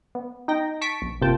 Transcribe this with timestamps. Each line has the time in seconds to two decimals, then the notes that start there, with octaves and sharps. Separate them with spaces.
0.15 B3
0.48 D#4 G5 A#6
0.81 A5 C#6 B6 D7
1.02 A#1
1.21 G1 C3 A#3 F4 G5 A5